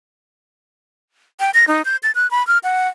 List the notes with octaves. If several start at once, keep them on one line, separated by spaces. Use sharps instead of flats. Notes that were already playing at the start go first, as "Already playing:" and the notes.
G5
A#6
D#4
G6
A6
F#6
B5
F6
F#5